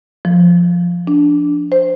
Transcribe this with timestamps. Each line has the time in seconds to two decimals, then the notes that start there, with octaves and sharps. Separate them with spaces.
0.25 F3
1.07 D4
1.72 C5